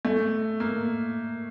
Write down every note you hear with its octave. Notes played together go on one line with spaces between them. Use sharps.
A3
A#3